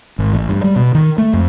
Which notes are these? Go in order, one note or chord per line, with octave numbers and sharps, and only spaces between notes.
G#1
A1
G2
G3
B2
D#3
A3
F2